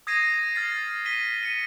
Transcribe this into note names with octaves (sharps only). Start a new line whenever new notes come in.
D#6 G#6 A#6 C7 D#7
F6 A6 C7
B6 D#7 G7
C#7 D#7